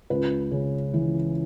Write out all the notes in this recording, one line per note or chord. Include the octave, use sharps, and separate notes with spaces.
C#2 B4
C#3
E3